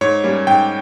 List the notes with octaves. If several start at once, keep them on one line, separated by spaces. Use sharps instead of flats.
G#2 C#5
G3 A#3 C#4
G#2 G5